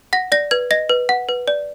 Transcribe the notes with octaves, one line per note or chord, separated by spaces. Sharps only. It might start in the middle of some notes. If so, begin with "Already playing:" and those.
F#5 A#6
D5 A#6
B4 G#6
D#5 A#6
B4
F#5
B4
D5